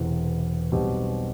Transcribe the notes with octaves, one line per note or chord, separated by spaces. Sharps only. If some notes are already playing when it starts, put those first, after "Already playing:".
Already playing: E1 E2 C3
B1 B2 G3 C4 G4